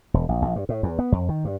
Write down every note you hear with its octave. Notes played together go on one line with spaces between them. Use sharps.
E1
A#1
A#1
G2
A2
E2
B3
F2
D#3
G2